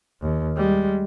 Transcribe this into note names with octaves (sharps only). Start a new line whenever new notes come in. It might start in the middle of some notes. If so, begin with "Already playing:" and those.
D#2
G3 G#3